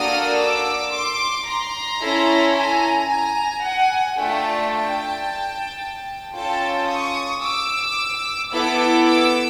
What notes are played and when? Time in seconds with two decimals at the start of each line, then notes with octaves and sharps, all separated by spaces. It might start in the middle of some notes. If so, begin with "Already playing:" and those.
Already playing: A#3 D4 F#4 A4 D#6 F6
0.37 D6 E6
0.92 C6 D6
1.47 A#5 C6
2.01 C#4 E4 A4
2.55 G#5 A#5
3.09 G#5 A#5
3.64 F#5 G#5
4.18 A3 D4 F4 G5 A5
4.72 G5 A5
6.35 C#4 F4 A4 G5 A5
6.89 C#6 D#6
7.43 D6 E6
8.52 B3 E4 A4 D6 E6
9.06 D6 E6